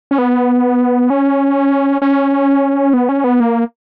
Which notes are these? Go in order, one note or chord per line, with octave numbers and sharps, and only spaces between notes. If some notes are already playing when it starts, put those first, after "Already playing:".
C#4
B3
C#4
C#4
B3
C#4
B3
A#3